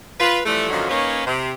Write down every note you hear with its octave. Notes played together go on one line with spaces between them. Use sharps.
F4 B4
E3 F3 G3 A3
F#2 A#2 D3 D#3 F3 F#3
A#3 C#4 D#4 B4 C#5
C3